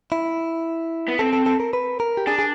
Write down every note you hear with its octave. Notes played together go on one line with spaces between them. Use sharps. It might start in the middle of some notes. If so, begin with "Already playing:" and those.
E4
B3
C4 A4
A4
A4
A#4
B4
A#4
G4
D4 G#4
G#4